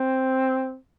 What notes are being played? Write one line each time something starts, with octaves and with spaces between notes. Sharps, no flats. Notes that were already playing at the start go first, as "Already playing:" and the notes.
Already playing: C4